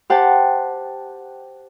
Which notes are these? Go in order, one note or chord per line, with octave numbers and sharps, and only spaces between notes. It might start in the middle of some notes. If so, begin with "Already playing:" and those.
G4 C5 F#5 G5 A5